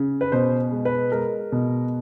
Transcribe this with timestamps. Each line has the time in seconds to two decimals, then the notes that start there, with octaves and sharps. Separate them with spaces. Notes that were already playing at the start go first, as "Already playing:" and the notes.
Already playing: C#3
0.21 B4
0.32 B2 C5
0.72 G#3
0.85 B4
1.12 G#3 A#4
1.52 B2